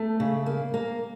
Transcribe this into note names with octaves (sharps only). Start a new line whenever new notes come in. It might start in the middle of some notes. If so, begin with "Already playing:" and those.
Already playing: A3
C#3
A#3
A#3